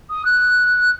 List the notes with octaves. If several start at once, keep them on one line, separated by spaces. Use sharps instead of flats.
D#6
F#6